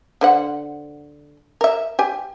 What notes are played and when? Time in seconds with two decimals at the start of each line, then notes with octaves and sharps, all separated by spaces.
0.21 D3 C5 F#5
1.61 A#4 E5
1.99 G4 G#5